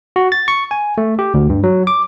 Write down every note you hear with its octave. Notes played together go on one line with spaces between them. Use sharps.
F#4
A6
C#6
G#5
A3
G4
D2
G2
F#3
D6